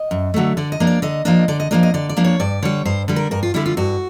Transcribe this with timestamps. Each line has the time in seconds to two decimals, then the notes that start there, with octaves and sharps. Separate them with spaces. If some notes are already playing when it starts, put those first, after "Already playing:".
Already playing: D#5
0.11 F#2
0.34 D3 F#3 A3
0.57 D3 D5
0.72 D#5
0.80 F3 A#3 D4
0.87 D5
1.02 D3 D#5
1.25 F3 A#3 D4 D#5
1.48 D3 D5
1.60 D#5
1.71 F3 A#3 D4 D#5
1.83 D#5
1.94 D3 D5
2.09 D5
2.16 F3 A#3 D4
2.24 C#5
2.40 G2 D5
2.62 D3 G3 C#5
2.85 G2 C5
3.08 D3 G3
3.16 A#4
3.31 G2 A#4
3.43 F4
3.54 D3 G3 E4
3.66 F4
3.77 G2 F#4